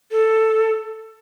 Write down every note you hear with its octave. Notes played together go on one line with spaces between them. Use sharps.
A4